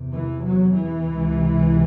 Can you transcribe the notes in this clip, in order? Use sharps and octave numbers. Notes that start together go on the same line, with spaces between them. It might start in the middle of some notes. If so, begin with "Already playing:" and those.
Already playing: E2 C3
E3
F#3
E3
C#2 C3